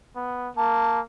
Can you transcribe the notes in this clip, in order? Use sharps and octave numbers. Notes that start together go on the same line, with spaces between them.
B3
A#3 A5